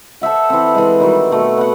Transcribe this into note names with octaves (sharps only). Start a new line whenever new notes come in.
A4 C5 E5 F#5
E3 C4
E3 G#3
D#3 G3 F#4
B2 A3 F#4
B3 F#5